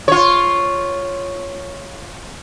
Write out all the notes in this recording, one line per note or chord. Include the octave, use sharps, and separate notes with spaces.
F4 C#5